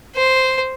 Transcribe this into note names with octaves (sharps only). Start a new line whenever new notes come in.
C5